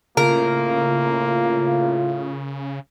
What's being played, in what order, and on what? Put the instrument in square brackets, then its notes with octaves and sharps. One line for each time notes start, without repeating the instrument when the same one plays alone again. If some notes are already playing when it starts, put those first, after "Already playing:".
[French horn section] A2 F4 [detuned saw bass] C#3 [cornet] A#3 [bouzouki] A#4